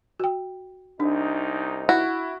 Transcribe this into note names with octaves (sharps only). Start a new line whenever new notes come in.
F#4 G5
C2 D4 D#4
E4 F#4